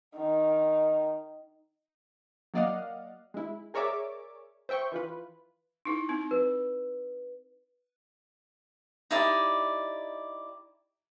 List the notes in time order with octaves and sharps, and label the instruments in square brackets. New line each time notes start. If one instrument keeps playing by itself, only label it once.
[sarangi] D#3
[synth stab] F#3 A#3 D5 D#5 F5 F#5
G#3 E4
G#4 A#4 C#5 D5 E5 D6
C5 E5 G5 C#6
E3 F4 B4
[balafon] D#4 E4
C4 D#4
[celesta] B4
[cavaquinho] D#4 E4 G4 D5